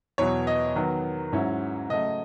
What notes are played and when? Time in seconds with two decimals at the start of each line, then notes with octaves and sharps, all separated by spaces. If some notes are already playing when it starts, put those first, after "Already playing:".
0.18 E2 B2 F#3 C#5
0.47 D#5
0.76 D#3 F#3 B3
1.32 G#2 F#3 C#4 E4
1.89 C#3 F#3 A3 D#5